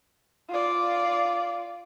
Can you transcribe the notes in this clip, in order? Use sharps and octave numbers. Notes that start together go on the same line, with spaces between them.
F4 D5